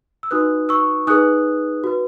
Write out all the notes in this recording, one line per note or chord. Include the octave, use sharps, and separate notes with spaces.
E6
D#4 F#4 B4 D#6 F#6
C#6 E6
D#4 G#4 B4 D#6 F#6
F#4 B4